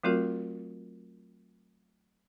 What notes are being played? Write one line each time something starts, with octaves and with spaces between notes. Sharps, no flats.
F#3 A3 C4 F4 F#4 A#4